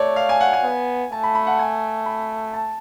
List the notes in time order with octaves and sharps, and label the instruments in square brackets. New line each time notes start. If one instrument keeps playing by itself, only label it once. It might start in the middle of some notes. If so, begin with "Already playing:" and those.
Already playing: [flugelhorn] A3 [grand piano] C#5 D5
[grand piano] F5
G#5
F#5
G#5
[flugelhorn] B3
[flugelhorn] A3 [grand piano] A5
[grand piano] B5
B5
F#5
G#5
B5
A5